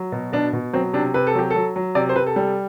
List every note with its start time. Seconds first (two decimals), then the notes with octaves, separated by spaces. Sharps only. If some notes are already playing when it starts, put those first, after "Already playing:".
Already playing: F#3
0.12 B2
0.33 B2 D4
0.53 B2
0.73 F#3 C4
0.93 C3 D4
1.14 C3 B4
1.27 A4
1.35 F#3 G4
1.50 F#3 A4
1.76 F#3
1.95 C3 D5
2.09 C5
2.15 C3 B4
2.26 A4
2.36 G3